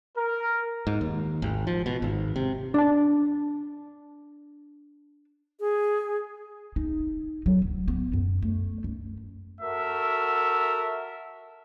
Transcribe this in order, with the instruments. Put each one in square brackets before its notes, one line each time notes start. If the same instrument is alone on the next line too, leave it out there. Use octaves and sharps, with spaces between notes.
[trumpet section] A#4
[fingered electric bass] G#2
D#2
G#1
F3
B2
G#1
C3
[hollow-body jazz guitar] D4 A5
[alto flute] G#4
[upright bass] D#4
F#3
D1
B3
F#2
A3
F#2
[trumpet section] F#4 A4 A#4 E5